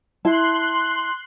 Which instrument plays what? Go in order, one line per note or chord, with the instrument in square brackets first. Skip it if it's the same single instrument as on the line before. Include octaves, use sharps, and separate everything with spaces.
[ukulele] E4 A5 [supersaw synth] C6 F#6